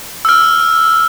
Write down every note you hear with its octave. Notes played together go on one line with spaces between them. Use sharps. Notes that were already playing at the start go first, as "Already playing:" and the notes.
E6 F6